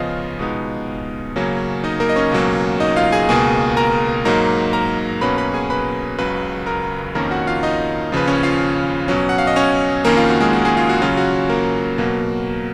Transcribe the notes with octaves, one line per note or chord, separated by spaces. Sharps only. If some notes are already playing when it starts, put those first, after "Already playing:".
Already playing: C#3 F3 B3 C#4 F4 D#5 F5
B2 G#3 B3 D#4
C#3 F#3 A#3 C#4
D#4 D#5
A#3 A#4
D#5
C#4 C#5
C#2 B2 F#3 A#3
D#4 D#5
F4 F5
G#4 G#5
C#2 B2 A#3 G#4 G#5
A#4 A#5
G#2 F#3 A#3 D#4 A#4 A#5
A#4 A#5
B2 F#3 A#3 C#4 B4 B5
B4 B5
G#4 G#5
B4 B5
C#2 C#3 F#3 B4 B5
A#4 A#5
F2 D#3 A#3 C#4 A#4 A#5
F#4 F#5
F4 F5
D#4 D#5
D#2 C#3 F3 B4
C#4 C#5
F4 F5
B2 F#3 C#4
F#5
F5
D#5
C#4 C#5
F2 D#3 A#3 C#4 A#4
F4
F#4
G#3 G#4
F#4
G#3 G#4
F4
F#4
C#3 F#3 C#4 F4
F#4
A#3 A#4
B2 F#3 A#3